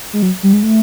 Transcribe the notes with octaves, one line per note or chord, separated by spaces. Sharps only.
G#3
F#3
G3
G#3
A3